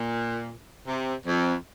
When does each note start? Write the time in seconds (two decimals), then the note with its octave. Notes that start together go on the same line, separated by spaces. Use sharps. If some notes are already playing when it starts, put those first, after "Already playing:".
Already playing: A#2
0.86 C3
1.25 F2